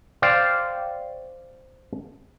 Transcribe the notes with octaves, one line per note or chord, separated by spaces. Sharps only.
C5 D5 F5 G5